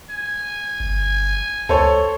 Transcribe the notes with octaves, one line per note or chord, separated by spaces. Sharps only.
G#5
G1
C#2 A4 C5 C#5